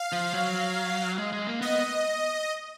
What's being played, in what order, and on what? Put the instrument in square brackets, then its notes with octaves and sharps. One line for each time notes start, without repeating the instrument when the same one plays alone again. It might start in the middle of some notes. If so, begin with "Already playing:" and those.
Already playing: [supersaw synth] F5
[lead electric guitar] F3
F#3
G#3
G#3
A#3
[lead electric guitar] B3 [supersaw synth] D#5